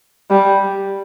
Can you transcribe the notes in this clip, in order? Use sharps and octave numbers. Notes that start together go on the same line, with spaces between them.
G3